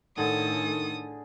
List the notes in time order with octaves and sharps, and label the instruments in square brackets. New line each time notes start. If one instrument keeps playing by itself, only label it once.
[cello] A2 A4 [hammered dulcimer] D3 G#4 [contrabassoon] D#3 [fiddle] D#6